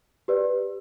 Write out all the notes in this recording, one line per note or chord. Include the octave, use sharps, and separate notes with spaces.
G4 B4 D5